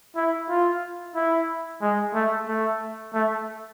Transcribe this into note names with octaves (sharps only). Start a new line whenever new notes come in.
E4
F4
E4
G#3
A3
A3
A3